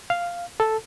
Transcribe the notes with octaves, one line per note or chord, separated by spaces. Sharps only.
F5
A4